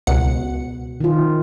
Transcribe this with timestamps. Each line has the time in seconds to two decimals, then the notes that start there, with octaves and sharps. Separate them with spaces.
0.07 C#2 B2 F#5 C#7
1.01 D#3 F4